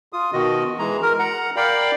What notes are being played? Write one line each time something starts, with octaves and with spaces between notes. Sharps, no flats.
F4 D#6
B2 D#3 F#4 D#5
E3 G#3 A#5
A#4
F#5 A#5
A#4 D5 F5 G5 B5